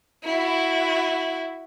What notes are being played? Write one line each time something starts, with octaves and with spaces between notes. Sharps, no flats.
E4 F#4